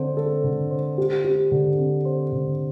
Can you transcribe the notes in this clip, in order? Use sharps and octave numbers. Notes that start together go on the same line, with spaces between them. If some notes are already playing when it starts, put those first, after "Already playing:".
Already playing: D3 C4 A4 C5
A4
D3
C5
G4
G4
D3
C4
C5
D3